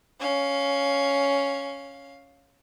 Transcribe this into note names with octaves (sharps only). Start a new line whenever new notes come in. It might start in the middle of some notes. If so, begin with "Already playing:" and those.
C#4 F5